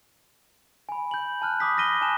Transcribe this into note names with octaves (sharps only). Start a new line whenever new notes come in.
G#5 B5
G6 F#7
A5 F6 F#6
B5 D6 D#6 B6
F6 A#6 B6 D#7 G7
G#5 A5 F#6 E7